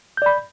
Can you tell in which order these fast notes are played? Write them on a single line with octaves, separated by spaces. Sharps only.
G6 D5 B5